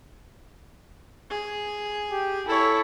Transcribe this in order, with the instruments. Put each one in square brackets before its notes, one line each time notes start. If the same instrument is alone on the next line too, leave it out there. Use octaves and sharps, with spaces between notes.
[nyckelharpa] G#4
[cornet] G4
[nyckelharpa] E4 C#5 [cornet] A4